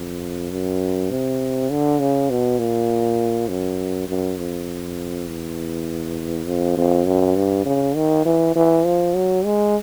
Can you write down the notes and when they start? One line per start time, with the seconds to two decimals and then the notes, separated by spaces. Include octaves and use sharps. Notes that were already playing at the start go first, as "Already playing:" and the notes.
Already playing: F2
0.51 F#2
1.11 C3
1.71 D3
2.00 C#3
2.30 B2
2.59 A#2
3.49 F#2
4.09 F#2
4.38 F2
5.28 E2
6.47 F2
6.77 F2
7.06 F#2
7.36 G2
7.66 C#3
7.96 D#3
8.26 E3
8.56 E3
8.85 F3
9.15 F#3
9.45 G#3